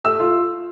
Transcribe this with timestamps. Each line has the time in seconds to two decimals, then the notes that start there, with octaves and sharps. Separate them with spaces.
0.04 A3 E6
0.20 F4